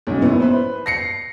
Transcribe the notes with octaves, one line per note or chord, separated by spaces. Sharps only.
B1 G#2 C#3
A#1 B3 E4
B4 C5
A#6 C7 C#7